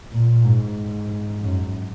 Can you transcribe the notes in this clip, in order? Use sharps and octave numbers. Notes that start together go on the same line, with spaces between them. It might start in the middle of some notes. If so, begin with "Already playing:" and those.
A#2
G#2
F#2